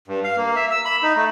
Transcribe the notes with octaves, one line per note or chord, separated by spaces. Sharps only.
G2
F5
A#3
E5
E6
B5
D#4
A3